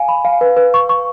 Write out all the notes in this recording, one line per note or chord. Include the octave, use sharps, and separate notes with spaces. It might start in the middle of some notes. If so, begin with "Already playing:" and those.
Already playing: F5 G#5
B5
F5
B4
B4
C#6
C#6